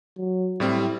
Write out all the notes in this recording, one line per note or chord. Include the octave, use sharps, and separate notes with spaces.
F#3
A2 G3 C4 E4